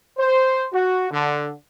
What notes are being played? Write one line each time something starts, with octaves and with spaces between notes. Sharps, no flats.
C5
F#4
D3